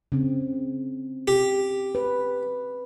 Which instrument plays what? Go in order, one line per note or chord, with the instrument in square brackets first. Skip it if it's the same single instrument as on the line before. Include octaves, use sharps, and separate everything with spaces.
[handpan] C#3 C4
[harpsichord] G4
[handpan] B4